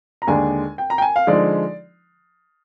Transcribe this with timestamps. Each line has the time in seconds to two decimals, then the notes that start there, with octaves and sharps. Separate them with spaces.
0.22 A#5
0.27 D#2 D3 G#3 D4 G#5
0.78 G5
0.90 A#5
0.98 G5
1.02 G#5
1.16 F5
1.27 D3 F3 G#3 D#4 D5